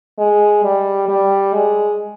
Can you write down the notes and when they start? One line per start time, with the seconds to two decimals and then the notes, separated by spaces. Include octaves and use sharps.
0.18 G#3
0.63 G3
1.08 G3
1.54 G#3